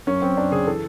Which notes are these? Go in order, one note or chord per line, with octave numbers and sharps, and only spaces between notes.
F#2 C#4
F#2 C4
F#2 D4
C#3 G#4
E3 A4